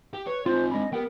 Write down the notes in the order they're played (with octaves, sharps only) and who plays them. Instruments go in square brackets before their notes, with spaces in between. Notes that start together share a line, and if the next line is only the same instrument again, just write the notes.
[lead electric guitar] G4
[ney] B4 [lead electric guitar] C#5
[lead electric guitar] C4 D#4 [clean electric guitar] F4 [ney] C5
[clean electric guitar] G#3 D4 B5 [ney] D#5
[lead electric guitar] B3 [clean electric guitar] G4 F#5 G5 [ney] A#4